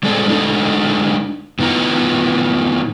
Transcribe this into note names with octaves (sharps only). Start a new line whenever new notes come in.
G3 G#3 C4 A4 D5
D3 G#3 A3 D4 D#4
A2 D#3 B3 F4 A#5